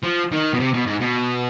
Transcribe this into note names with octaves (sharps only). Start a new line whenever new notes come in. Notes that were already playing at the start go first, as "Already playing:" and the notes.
F3
D#3
B2
C3
B2
G#2
B2